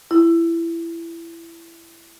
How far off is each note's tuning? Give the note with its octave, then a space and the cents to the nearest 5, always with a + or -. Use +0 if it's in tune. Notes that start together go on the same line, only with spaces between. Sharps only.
E4 +20